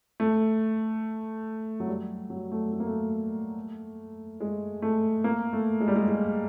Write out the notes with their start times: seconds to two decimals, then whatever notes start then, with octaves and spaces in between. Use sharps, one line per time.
0.20 A3
1.80 F#3
1.88 G3
2.30 F#3
2.52 A3
2.72 A3
2.80 A#3
2.87 A3
4.40 G#3
4.82 A3
5.24 A#3
5.53 A3
5.81 G#3
5.88 G3
5.96 G#3
6.08 G#3